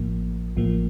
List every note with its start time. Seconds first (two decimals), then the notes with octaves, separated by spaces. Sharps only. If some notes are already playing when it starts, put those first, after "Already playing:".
Already playing: A1 A2 F3 A#3
0.56 A1 A2 F3 A#3